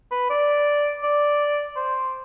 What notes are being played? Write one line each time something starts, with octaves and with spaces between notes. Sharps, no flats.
B4
D5
D5
C5